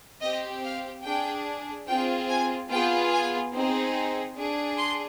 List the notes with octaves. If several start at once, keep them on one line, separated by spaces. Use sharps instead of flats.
C4 G4 D#5
F5
D4 G#4 G5
C4 F4 G#4 G5
G#5
B3 F4 G#4 G5
G#5
C4 D#4 G#4
D4 G#4
C6